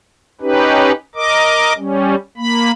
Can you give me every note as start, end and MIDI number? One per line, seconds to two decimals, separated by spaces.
0.41 0.92 61
0.41 0.92 63
0.41 0.92 67
0.41 0.92 71
1.15 1.73 70
1.15 1.73 75
1.15 1.73 86
1.77 2.15 55
1.77 2.15 61
2.37 2.71 58
2.37 2.71 83